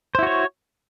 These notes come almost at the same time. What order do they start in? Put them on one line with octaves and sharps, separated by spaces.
C5 E4 F#4 C#5